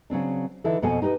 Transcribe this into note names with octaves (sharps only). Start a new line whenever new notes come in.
C#3 F#3 C4 D4
D3 E3 D#4 E4 A4
F2 B2 F#4 A4 C5 G#5
D#4 G4 B4 D#5